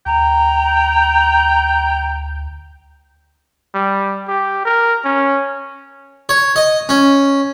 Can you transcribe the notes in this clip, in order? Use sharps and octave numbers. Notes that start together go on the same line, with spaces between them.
D2 G5 A#5
G3
G4
A#4
C#4
C#5
D#5
C#4